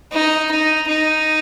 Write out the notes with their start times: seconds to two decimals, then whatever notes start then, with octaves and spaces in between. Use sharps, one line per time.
0.12 D#4
0.51 D#4
0.88 D#4